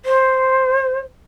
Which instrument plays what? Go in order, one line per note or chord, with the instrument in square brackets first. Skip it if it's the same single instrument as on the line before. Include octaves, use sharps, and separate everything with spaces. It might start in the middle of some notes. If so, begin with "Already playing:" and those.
[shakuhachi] C5